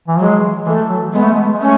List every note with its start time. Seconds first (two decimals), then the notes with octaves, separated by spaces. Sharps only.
0.08 E3
0.19 F#3 G#3
0.66 E3 A3
0.89 F#3
1.13 G#3 B3
1.23 A3
1.32 G#3
1.54 G#3
1.61 A3 C#4